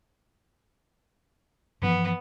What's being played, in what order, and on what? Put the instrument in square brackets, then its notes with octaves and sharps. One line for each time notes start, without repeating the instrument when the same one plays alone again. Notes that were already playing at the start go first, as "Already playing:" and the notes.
[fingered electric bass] G2 E3 F3 [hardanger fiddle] B3